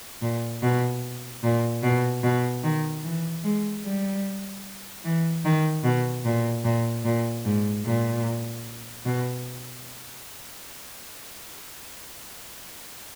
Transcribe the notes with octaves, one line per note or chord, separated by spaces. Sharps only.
A#2
B2
A#2
B2
B2
D#3
E3
G#3
G3
E3
D#3
B2
A#2
A#2
A#2
G#2
A#2
B2